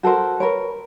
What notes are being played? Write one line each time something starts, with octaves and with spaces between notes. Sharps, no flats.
F#4 A4 A#4 C5
A#4 B4 C#5